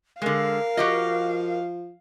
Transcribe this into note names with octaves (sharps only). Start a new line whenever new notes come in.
D3 G#3 A#4 F5
F3 F#4 G4 D#5